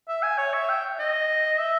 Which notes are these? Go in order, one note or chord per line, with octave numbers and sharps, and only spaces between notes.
E5
G#5
C#5
E5
G5
D#5
E5